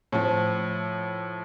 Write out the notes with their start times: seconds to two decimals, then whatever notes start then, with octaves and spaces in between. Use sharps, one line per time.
0.12 A2 F3